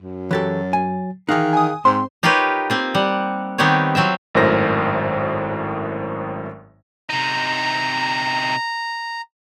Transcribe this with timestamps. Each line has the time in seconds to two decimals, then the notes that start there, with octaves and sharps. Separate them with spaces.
0.02 F#2
0.31 E3 F#3 G4 A4 A6
0.73 G#5
1.29 D#3 E3 D#4 G#4 F5 F#6
1.53 G#5 D#6
1.85 G#2 C4 C5 C6
2.23 D#4 F4 G4 A#4 B4 C#5
2.70 A#3 C4 F4
2.95 G3 F#5
3.58 D#3 B3 C4 D#4 G4 C#5
3.95 F#3 C4 F4 E5
4.35 G#1 F#2 A2 A#4 C5 A#6
7.09 C3 D#4 A#5